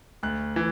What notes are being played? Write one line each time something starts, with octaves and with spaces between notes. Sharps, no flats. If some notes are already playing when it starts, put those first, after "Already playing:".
D2 F#6
E3